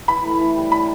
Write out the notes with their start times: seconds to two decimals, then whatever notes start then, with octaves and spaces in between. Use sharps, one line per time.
0.08 E3 B5
0.25 A3
0.40 E3
0.56 G3
0.72 D4 B5